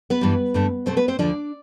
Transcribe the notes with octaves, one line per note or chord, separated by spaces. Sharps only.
B3 B4
G2 E3 G3
G2 D3 A3
B2 A3 C4 C5
B3 B4
C4 C5
D2 D3 F3 D4 D5